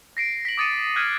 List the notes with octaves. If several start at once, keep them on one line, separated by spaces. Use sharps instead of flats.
A#6 C7 D7
B6 F#7
D6 D#6 A6 C#7 D#7
F6 F#6 G#6 B6 D#7